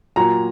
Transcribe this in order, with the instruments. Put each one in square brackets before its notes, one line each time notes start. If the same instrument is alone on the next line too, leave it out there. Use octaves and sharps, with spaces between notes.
[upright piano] A#2 F#3 A#5